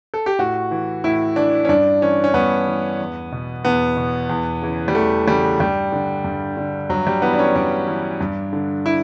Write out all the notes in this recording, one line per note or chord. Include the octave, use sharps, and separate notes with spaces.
A4
G4
A2 F#4
E3
A2 E4
E3 D4
C#4
G2 D4
E3 C#4
C#4
G2 B3
E3
E2
B2
E2 B3
B2
E2
C#3 E3
G3
E2 A3
C#3 E3 G3
G2 G3
D3
G2
D3
G2 F#3
G3
E3 B3
D4
C#4
G2 D4
E3
G2
D3
E4